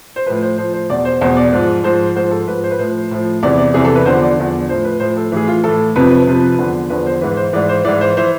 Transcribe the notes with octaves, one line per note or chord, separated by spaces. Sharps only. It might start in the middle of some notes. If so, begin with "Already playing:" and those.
C5
A2 F3 B4
C5
A2 F3 C5
C5
E2 B2 D5
C5
E2 B2 C5
D5
G#2 F3
G#2 F3 C5
G#2 F3 C5
A4
G#2 F3 B4
C5
B4
A2 F3 C5
A2 F3
E2 C3 E3 D5
D5
E2 C3 E3 G#4
A4
B4
E2 D3 F3 C5
D5
E2 D3 F3
A2 F3 C5
B4
A2 F3 C5
A4
A2 E3 G#4
F4
A2 E3 A4
F2 C3 F3 B4
B4
F2 C3 F3
E2 D3 F3
E2 D3 F3 B4
C5
G#2 E3 B4
C5
G#2 E3 D5
C5
G#2 E3 D5
C5
E3 C5